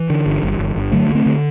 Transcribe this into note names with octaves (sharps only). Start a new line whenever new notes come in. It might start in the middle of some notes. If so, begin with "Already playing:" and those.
Already playing: E3
D3
G1
G1
G1
G1
D3 F#3 A3
D2
A3 C4
D3